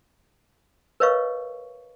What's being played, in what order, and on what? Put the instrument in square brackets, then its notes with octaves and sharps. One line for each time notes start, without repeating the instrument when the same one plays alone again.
[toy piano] A#4 B4 C#5 D#5 F5 C#6